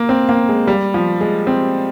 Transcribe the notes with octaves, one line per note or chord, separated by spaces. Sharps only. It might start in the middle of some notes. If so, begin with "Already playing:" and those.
Already playing: A#3
C4
A#3
G#3
G3
F3
G#3
C4